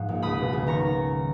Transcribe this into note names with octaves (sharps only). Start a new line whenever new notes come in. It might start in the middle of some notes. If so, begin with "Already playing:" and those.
Already playing: G#2 F3
A#1
C#2 B5 D#6
B2
C#2
D#3 A#5 C#6